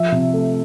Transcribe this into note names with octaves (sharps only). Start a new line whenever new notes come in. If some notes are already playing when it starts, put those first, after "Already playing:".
Already playing: F3 E5
C3
A3